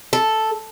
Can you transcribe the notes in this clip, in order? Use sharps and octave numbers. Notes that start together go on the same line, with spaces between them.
A4